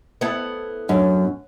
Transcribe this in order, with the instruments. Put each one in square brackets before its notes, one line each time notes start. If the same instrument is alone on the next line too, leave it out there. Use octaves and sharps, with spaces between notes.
[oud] B3 E4 A4
[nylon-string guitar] F#2 [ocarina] D4